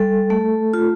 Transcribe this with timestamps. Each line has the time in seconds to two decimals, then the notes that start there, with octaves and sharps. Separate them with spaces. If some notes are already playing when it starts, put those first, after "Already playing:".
Already playing: G3 A4
0.30 A3
0.74 F4